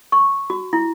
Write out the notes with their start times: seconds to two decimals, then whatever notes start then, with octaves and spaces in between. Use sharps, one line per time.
0.12 C#6
0.50 F#4
0.73 E4